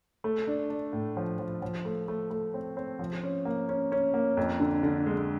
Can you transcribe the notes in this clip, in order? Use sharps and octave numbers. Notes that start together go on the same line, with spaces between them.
A3
D4
D4
A2
F3
F3
F3
A3
A3
A3
C4
C4
F3
C#4
A#3
C#4
C#4
A#3
F2
D3
D3
G#3